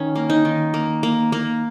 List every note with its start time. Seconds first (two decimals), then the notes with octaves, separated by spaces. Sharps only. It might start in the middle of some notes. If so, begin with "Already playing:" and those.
Already playing: D#3 C#4
0.15 A#3
0.30 D#4
0.45 D#3
0.74 A#3
1.03 A#3
1.32 A#3